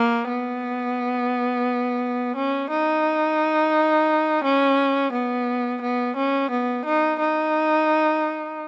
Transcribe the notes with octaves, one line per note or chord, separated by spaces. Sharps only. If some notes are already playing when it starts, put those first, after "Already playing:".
Already playing: A#3
B3
C#4
D#4
C#4
B3
B3
C#4
B3
D#4
D#4